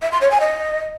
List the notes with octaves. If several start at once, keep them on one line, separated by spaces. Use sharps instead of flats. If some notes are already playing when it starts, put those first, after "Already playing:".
E5
C6
C#5
G#5
D#5